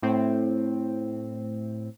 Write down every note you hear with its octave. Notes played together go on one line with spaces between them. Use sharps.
A2 C4